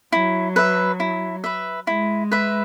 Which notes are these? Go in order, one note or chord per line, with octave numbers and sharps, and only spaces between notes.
F#3 E4
B4 E5
E4
B4 E5
G#3 E4
B4 E5